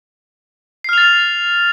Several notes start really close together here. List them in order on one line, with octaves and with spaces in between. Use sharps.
C7 F6 F7 A6